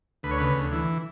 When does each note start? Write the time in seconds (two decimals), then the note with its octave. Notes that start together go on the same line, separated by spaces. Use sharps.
0.23 D2 B4
0.31 C#5
0.38 C#3 B4
0.57 D2
0.72 E3